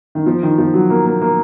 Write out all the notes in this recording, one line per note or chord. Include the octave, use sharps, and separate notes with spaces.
D#3
F3
D#3
F3
F#3
A#3
A#3
A#3